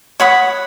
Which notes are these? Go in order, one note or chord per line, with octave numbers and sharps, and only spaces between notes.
C#5 F#5 B5 D#6